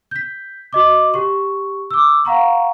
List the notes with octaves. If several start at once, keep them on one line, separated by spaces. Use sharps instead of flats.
G6 B6
F#4 D#5 D6
G4 C#6
D6 E6
F5 F#5 A#5 C#6